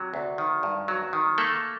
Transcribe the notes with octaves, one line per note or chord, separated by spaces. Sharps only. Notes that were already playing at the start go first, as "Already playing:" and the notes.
Already playing: C3 F#3
D2
D#3
G2
F#3
D#3
A3 A#3 A4